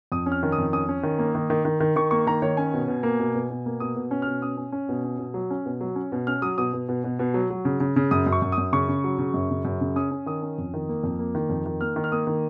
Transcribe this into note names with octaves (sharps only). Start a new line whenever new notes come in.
F2 D#6
C#4
F6
D#3
D#6
F2
C#4 D#6
C#4
D#3
A#3
D#3
D#3
D#3
D#3
D#3 C#6
A#3 C#6
D#3 A#5
D#3 C#5
C#4 G#5
B2
B2
A#3
B2
B2
B2
A#3
B2 D#6
B2
C#4
B2 F6
C#4 D#6
C#4
C#4
B2
C#4
B2
F#3
C#4
B2
F#3
C#4
B2
C#4 F6
F#3 D#6
B2 D#6
B2
B2
B2
B2
F#3
F#3
C#3
C#3
C#3
F#2 D#6
F#2
C#6
F#2
D#6
F#2
C#3 C#6
C#3
F#3
C#3
F#2
C#3
F#2
C#3
C#4 D#6
C#4
D#3 D#6
C#4
F2
D#3
A#3
F2
A#3
D#3
F2
D#3
A#3 F6
D#3
F6
A#3 D#6
D#3